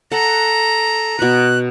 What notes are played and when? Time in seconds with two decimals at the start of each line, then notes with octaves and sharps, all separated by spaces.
0.12 A4 F#5 A#5
1.19 B2 B4 F#6